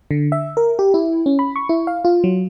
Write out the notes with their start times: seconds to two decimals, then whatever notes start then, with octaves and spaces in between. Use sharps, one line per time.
0.11 D3
0.32 E5
0.57 A#4
0.79 G4
0.94 E4
1.26 C#4
1.39 B5
1.56 C#6
1.69 E4
1.87 F5
2.05 F4
2.24 F#3